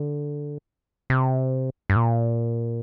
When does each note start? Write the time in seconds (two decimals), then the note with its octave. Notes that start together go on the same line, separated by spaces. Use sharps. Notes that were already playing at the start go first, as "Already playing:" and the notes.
Already playing: D3
1.10 C3
1.90 G2
1.96 A#2